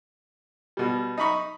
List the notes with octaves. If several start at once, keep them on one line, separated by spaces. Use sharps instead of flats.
B2 G3
D#4 A#5 B5 C#6